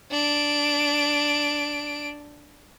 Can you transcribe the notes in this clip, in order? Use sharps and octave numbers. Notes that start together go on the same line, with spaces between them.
D4 D7